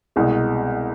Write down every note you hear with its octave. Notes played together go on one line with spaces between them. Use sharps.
C2 B2 G#3